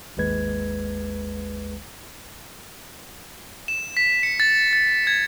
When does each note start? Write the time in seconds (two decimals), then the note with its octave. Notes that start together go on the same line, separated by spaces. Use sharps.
0.17 G#1 D#2 G#3 B4 G#6
3.68 E7
3.97 B6
4.23 C#7
4.40 A6
4.73 A6
5.07 G#6